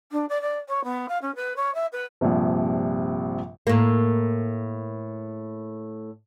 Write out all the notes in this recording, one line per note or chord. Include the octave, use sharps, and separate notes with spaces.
D4
D5
D5
C#5
B3
F5
C#4
B4
C#5
E5
B4
A#1 G2 C3 F3
A2 A#3